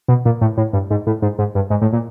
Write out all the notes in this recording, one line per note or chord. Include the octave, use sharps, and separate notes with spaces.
B2
A#2
A2
A2
G2
G#2
A2
G#2
G#2
G2
G#2
A2
A#2